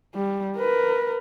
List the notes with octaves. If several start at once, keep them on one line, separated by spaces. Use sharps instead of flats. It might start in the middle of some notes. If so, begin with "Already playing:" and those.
G3
A#4 B4